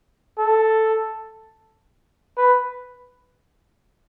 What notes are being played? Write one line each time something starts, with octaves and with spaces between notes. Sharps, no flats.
A4
B4